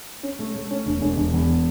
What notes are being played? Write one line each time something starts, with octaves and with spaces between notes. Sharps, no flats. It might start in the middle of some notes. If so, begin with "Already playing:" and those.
C#4
A3
A3
C#4
E1
E1
E1
E2